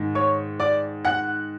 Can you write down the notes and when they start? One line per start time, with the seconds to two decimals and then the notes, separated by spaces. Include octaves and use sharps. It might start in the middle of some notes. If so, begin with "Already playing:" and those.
Already playing: G#2 D#3
0.15 C#5 C#6
0.60 D5 D6
1.05 F#5 F#6